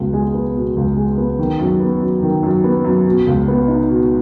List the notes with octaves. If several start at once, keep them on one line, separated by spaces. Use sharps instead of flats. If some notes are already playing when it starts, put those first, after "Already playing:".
Already playing: C#2 B2
G#3
B3
B2
C#2
G#3
B3
D#3
F#2
B3
F#2
D#3
F#2
B3
F#2
B2
C#2
B3
D#4
B2